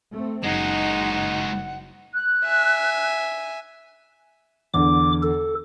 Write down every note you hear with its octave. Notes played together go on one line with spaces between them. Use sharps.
A3 C4
F#1 G#3 D#4 F#4 F#5
F#6
E5 G#5
E2 D3 D6
A4